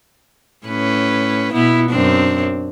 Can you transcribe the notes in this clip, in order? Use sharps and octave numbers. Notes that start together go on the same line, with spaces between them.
A2 C#4 B4
B2 B3 E4
F#2 C4 D4